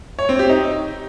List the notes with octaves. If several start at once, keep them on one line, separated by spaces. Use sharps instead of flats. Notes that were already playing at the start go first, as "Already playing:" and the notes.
C#5
C4
G4
D#4